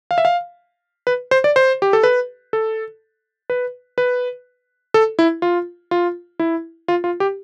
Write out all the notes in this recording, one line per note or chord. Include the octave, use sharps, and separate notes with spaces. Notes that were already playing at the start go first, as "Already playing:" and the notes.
F5
E5
F5
B4
C5
D5
C5
G4
A4
B4
A4
B4
B4
A4
E4
F4
F4
E4
F4
F4
G4